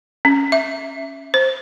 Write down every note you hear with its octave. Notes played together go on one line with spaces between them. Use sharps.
C#4
E5
C5